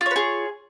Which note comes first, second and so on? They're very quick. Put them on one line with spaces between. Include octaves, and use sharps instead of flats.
F4 C#5 B4 G#4